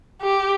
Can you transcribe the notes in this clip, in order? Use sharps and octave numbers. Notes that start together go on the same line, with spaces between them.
G4